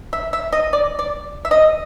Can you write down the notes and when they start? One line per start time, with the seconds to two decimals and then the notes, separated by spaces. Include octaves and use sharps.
0.13 E5
0.33 E5
0.53 D#5
0.73 D5
0.99 D5
1.45 E5
1.51 D#5